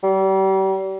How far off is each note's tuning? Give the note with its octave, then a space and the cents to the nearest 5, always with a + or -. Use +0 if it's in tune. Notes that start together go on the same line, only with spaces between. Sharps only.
G3 -35